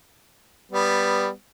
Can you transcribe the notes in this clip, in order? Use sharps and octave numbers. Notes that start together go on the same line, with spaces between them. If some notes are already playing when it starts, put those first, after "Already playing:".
G3 B3